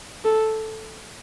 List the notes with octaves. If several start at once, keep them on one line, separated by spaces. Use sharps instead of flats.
A4